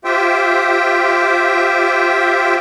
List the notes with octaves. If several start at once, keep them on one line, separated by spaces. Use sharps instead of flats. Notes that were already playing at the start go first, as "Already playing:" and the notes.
F4 G4 C5 E5 G5